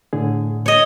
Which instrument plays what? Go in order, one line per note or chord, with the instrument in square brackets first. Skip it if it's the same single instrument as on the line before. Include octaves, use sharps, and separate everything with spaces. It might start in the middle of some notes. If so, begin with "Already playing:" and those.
[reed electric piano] A2 D3 G#4
[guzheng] C#5 D#5